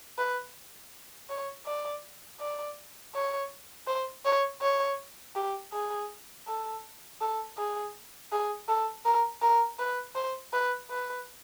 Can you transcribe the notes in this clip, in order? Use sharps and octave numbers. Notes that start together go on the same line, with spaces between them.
B4
C#5
D5
D5
C#5
C5
C#5
C#5
G4
G#4
A4
A4
G#4
G#4
A4
A#4
A#4
B4
C5
B4
B4